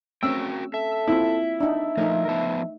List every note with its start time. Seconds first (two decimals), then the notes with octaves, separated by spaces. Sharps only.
0.23 A3 C4 C#4 F#4 A#4 G5 E6
0.74 A4 E5
1.08 A#3 C4 E4 F4
1.60 D4 D#4 E5
1.97 F3 A3 D#4 A#4
2.28 F3 B3 A5